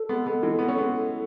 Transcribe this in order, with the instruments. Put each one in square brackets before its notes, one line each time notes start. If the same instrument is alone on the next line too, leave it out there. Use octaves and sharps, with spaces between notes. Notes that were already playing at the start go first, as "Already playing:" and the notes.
Already playing: [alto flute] A4
[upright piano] G#3 B3
G#3 B3
E3 G#3
B3
C#4
G#3 B3